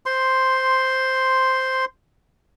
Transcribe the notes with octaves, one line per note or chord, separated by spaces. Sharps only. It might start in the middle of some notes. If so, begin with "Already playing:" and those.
C5 C6